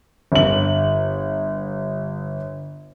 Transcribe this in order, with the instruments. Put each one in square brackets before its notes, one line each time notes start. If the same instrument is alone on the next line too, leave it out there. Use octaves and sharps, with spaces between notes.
[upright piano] G1 F#7